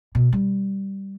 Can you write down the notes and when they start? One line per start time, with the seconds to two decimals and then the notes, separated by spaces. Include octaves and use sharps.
0.15 B2
0.33 G3